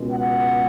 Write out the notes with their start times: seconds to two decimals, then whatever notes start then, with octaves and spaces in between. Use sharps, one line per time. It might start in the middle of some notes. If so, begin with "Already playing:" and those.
Already playing: C#2 B2 G#3
0.10 F#5